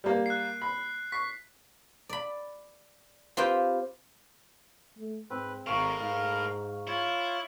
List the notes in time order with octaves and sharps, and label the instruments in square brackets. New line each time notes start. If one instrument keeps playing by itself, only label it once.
[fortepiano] G3 A#3
[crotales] F#6 C7
[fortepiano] B5
[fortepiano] C#6 [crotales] B6 C7
[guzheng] D5 B5
C4 F4 G4 B4 C5 G5
[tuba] A3
[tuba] G#2 [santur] C4 [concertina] B4
[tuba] G#1 [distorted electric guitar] A2 [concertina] A#4 F6 [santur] F5 A#5 C#6
[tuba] G#2 [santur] F5
[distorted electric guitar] E4 [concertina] F4 C#5